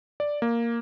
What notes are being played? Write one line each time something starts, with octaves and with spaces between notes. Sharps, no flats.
D5
A#3